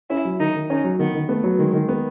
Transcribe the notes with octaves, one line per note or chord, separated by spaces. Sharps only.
C#4 E4
F#3
D#3 D#4
D#3
C#4 D#4
F#3
D#3 B3
D#3
A3 B3
F#3
D#3 G#3
D#3
B3